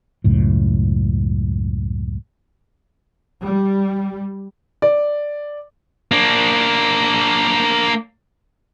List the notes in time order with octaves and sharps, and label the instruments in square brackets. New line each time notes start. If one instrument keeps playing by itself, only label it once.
[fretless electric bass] C#2 F#2 A2
[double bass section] G3
[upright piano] D5
[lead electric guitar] A#3 D4